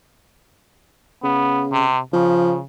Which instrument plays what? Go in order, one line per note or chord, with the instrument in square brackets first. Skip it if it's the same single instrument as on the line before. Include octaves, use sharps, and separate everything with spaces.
[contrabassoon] C#3 [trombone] B3
[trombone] C3
[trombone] C#3 [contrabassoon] F3